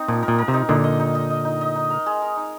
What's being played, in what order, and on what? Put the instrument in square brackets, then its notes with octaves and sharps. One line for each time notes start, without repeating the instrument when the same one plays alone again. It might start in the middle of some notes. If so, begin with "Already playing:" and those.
Already playing: [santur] C4 D#4
[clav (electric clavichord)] A#2 [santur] F3
[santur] A#4
[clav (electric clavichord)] A#2
[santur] A#4
[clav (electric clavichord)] C3
[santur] D#4
[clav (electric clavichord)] A#2 D3 [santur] D#4
[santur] D#5
D#4
D#5
D#5
D#4
D#5
D#4
A#4
G#3
A#4
D#4